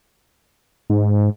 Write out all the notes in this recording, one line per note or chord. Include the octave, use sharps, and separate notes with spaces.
G#2